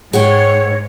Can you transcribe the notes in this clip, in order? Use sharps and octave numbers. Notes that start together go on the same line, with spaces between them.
G#2 G#4 C#5 F#5 G5